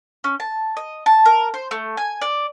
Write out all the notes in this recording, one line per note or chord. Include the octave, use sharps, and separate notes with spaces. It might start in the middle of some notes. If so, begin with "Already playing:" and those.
C#4
A5
D#5
A5
A#4
C5
A3
G#5
D5